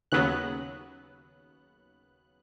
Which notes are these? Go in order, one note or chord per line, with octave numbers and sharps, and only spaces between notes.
D#2 C#3 F#3 B3 F#6